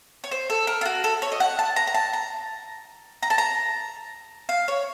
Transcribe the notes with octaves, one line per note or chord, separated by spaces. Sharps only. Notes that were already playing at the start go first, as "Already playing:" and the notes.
C#5
C5
A4
A#4
F4
F#4
A4
C#5
D#5
F#5
A5
A#5
A#5
A5
A#5
A#5
A5
A#5
F5
C#5